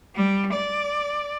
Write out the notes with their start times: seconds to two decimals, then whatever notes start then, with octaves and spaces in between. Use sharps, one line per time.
0.15 G3
0.53 D5